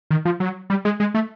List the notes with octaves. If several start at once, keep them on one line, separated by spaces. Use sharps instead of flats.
D#3
F3
F#3
G3
G#3
G#3
A3